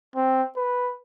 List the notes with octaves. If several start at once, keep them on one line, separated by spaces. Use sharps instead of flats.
C4
B4